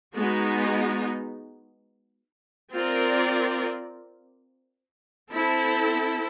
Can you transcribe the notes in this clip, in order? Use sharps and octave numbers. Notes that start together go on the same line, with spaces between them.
G#3 B3 D#4 F#4
C4 F4 A#4 D5
C4 E4 A4